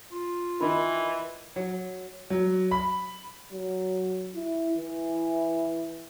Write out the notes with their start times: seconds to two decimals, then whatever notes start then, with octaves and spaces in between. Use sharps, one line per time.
0.12 F4
0.60 D#3 E3 D#4 B5
1.56 F#3
2.30 F#3
2.71 B5
3.52 F#3
4.35 E4
4.78 E3